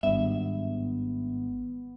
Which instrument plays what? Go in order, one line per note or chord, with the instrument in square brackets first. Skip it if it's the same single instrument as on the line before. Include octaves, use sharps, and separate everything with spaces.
[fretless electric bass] G#1 G2 [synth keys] B3 [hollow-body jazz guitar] E5